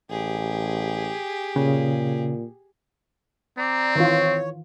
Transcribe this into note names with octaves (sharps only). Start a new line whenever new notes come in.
A1 G4 G#4
A#2 C#3
C4 D5 A#5
D#3 E3 F4 C#5